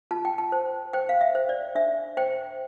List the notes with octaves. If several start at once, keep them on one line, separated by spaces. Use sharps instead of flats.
F4 A5
G5
A5
C5
C5 G5
F5
E5
C5
D5
D4 E5
C5 G5